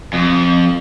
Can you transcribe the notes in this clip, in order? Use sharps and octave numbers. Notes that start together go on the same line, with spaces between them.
F2